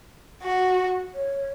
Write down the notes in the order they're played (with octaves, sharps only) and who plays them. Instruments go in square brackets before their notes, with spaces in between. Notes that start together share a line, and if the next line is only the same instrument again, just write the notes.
[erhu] F#4
[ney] C#5